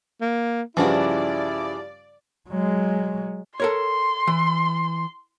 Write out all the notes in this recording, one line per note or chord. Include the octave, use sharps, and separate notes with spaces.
A#3
G2 C#3 E3 F3 D4 E4 F#4 D5
F#3 G#3
A4 A#4 C#5 C6
E3